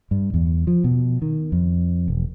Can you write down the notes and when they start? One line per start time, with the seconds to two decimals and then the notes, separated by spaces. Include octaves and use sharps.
0.11 G2
0.34 E2
0.67 F3
0.84 B2
1.22 D#3
1.52 F2
2.08 E1